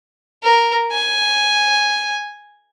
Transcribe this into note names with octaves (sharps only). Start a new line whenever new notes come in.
A#4
G#5